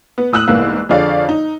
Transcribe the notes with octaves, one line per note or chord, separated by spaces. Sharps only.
B3
A2 D#6 E6 F#6 F#7
C2 G#2 E3 A#3 B3
F2 D3 G#4 C#5 D5 F5
D#4